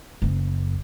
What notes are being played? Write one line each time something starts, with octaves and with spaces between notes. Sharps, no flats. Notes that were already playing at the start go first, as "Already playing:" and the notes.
F#1 F#2